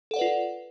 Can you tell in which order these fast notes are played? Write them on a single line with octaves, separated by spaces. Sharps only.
A4 F#5 D5 B4 F4